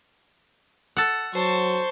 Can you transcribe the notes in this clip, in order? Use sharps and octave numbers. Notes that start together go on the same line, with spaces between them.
A4 F#5
F#3 C5 A5 C#6